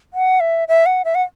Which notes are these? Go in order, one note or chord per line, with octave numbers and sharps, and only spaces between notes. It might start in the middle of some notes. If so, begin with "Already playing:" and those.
F#5
E5
E5
F#5
E5
F#5